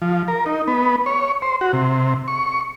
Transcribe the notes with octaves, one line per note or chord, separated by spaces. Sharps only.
F3
A#4
D#4
B3
C#5
C5
F#4
C3
C#6